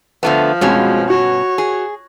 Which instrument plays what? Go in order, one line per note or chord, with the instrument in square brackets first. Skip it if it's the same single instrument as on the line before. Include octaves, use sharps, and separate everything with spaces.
[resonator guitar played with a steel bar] D3 A3 B3 [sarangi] F3
[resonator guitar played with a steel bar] G2 B2 C#4 [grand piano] G#3 C4 F#4
[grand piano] F#4 [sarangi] C#5
[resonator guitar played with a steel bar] G#4